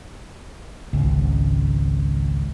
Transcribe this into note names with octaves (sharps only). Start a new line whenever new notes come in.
G#1 C#2